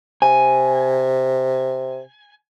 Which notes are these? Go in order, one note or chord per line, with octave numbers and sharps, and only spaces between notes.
C3 G#5